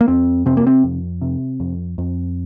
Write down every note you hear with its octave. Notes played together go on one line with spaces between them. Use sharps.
A#3
F2 C4
C3 C4
A#3
C4
F2
C3
F2
F2